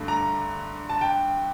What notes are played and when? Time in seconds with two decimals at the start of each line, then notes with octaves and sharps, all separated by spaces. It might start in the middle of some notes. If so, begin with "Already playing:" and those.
Already playing: G2 D3 A3
0.08 A#5
0.89 A5
1.01 G5